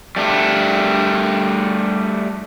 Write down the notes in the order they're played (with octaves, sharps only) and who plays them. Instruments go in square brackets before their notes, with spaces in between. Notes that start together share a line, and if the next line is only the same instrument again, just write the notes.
[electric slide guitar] G3 A3 D4